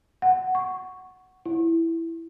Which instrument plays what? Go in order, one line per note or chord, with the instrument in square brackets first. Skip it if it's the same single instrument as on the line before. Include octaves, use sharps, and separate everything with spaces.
[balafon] F#5
C#6
E4